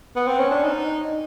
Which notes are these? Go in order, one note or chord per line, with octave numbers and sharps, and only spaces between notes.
B3
C4
C#4
D4
D#4